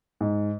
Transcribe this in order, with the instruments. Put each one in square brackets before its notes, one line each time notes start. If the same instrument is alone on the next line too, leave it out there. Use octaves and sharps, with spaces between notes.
[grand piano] G#2